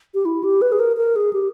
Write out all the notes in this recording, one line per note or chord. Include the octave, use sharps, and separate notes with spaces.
G4
E4
G4
B4
G#4
A#4
A#4
G#4
G4